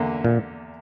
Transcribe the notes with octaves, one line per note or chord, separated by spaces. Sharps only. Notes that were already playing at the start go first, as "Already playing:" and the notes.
Already playing: E2 D3 A#3
A#2